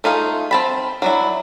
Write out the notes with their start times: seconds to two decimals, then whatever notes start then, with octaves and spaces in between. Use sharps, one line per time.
0.04 A3 D#4 F4 G#4
0.51 C4 A5 B5
1.02 F#3 D4 E4